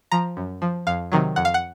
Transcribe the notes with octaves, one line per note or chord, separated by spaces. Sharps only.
F3 A#5
F#2
F3
F2 F5
C3 D#3 F#3
F2 F#5
F5
F#5